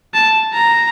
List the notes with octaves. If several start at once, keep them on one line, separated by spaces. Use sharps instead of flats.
A5
A#5